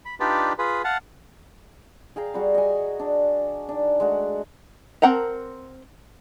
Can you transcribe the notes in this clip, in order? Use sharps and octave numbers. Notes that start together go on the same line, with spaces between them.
B5
D4 D#4 F4 G4 B4 D5
F4 G#4 B4
F5 F#5 A5
G#4 F5 G5 A#5
G3 F#4 G#4
D#5 G#5
D4
D#3 D4
G#3 A3 F#4 F#5
C4 A#4 F#5 A5 A#5